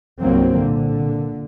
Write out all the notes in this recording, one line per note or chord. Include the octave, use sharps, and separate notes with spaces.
C2 G2 F#3 A#3 C4
A#2 D3